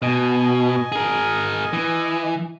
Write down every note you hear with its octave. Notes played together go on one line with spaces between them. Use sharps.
B2 D#5 G#5
G#4 A#4
E3